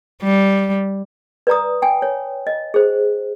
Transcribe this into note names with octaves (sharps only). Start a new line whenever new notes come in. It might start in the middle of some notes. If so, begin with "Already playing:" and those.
G3
B4 D5 A#5 D#6
G5 G#5
C#5
D#5
G#4 C5